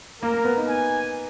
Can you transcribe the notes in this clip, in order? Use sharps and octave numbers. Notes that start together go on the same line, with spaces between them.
A#3 A#4
A#3
B3
D#4
G#5